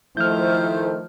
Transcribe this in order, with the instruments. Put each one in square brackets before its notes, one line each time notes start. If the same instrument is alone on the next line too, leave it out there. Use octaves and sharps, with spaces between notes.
[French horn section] D#3 A3 C5 [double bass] F3 [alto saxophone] E4 [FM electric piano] F6 G6